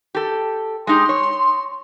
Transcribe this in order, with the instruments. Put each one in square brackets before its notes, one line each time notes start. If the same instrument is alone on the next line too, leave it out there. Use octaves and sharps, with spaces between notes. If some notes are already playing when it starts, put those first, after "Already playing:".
[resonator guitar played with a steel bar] G4 A4
[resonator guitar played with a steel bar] G#3 D#4 G4 [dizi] C6
[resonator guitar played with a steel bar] C#5